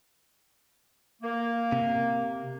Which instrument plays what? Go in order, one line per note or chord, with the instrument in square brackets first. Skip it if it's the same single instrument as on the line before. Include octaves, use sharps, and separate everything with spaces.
[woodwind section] A#3
[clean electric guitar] C3